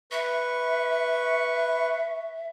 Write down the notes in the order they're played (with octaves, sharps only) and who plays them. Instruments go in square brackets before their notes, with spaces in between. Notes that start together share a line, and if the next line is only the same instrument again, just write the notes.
[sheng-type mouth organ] B4 C#6 [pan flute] E5